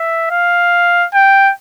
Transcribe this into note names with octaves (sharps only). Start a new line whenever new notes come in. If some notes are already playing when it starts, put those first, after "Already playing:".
Already playing: E5
F5
G5